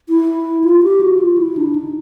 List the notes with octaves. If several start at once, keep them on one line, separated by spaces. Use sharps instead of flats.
E4
F4
G4
F#4
F4
E4
D4
D#4